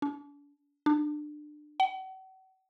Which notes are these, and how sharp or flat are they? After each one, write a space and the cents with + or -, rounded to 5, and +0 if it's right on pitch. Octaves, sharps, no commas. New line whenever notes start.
D4 -40
D4 +25
F#5 +40